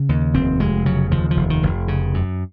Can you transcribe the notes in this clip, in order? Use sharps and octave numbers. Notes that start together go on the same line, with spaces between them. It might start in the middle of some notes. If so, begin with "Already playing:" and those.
Already playing: C#3
D#2
F1 C4
F1 G#3
C#3 F#3
D#2 F3
F3
F1
D#3
F1
C#3
F#2